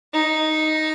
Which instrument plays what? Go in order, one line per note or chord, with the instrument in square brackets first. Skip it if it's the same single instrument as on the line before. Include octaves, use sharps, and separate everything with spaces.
[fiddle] D#4